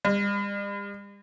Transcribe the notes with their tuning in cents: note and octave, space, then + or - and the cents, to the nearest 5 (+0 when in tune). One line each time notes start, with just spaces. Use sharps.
G3 +45